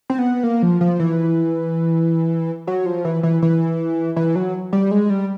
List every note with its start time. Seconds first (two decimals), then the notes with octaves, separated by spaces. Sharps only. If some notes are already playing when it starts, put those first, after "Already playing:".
0.10 C4
0.19 B3
0.43 A#3
0.62 F3
0.81 F3
1.00 E3
2.67 F#3
2.86 F3
3.05 E3
3.23 E3
3.42 E3
4.16 E3
4.35 F#3
4.73 G3
4.91 G#3
5.10 G3